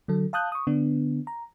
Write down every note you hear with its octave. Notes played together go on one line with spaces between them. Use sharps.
D3 F#3 A4
F5 A5 D#6 F#6 G6
C#6 D#6
D3 B3 D4
A#5